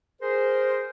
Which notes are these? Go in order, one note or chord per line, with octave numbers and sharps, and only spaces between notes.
G#4 A#4 C5